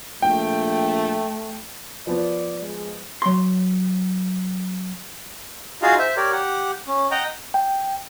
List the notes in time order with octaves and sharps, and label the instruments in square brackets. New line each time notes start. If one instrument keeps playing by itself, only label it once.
[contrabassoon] A#1 [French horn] A3 [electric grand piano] G5
[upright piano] F3 B3 [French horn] D5
[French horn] G#3
[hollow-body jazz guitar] F#3 C6
[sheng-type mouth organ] D#4 F4 F#4 G#4 F5
C5 E5
G4 A#4 C#5 D5
G4 F#5
C#4
D#5 F#5 G5 A#5
[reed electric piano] G5